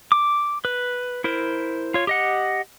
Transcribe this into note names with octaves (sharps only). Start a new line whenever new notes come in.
D6
B4
E4 A#4 C5
F4 C#5
G4 D#5 F#5